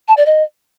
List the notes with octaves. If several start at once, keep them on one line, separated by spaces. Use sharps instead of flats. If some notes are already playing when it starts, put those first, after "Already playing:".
A5
D5
D#5